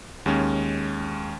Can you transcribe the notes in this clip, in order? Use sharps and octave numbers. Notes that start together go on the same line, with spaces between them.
D#2 G#3 C#4